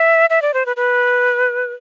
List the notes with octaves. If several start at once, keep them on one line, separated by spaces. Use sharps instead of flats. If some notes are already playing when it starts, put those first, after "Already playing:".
Already playing: E5
E5
D5
C5
B4
B4